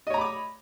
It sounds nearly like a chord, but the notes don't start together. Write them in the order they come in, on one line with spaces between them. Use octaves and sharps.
D#5 C#5 A#5 B5 D6